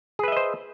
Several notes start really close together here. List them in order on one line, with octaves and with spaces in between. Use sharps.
G#4 B4 E5 D#5 C5